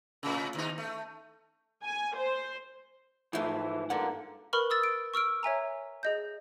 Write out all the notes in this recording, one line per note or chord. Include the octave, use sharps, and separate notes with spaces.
A2 C#3
D#2 D#4
A3
G#5
C5
G#2 E3 F3 A3 E4
G2 A#3 A4 F#5
A#4 B4 B5 C#6 F6
D#6 E6 A6
D7
C#6 E6 F6 D7
C#5 E5 G#5 A#5
G#4 D#5 G6